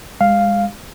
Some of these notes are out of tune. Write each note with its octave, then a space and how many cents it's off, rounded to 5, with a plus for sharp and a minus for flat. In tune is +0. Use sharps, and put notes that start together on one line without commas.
G#3 -30 F5 +0